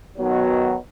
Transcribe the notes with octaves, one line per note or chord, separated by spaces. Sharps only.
B2 D#3 F#3